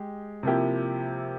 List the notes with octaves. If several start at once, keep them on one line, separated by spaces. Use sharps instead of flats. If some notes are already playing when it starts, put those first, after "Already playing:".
Already playing: G#3 G4
C3 F3 A#3 E4 G4